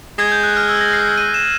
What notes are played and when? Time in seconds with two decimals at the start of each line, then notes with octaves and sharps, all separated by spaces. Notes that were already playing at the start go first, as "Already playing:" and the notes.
0.19 G#3 G#6
0.32 G6
0.43 F#6
0.57 F6
0.69 E6
0.81 A#6
0.93 C7
1.17 D#7
1.34 E7